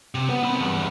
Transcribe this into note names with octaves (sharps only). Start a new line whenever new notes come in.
C3
B3
C4 B5
E2 G2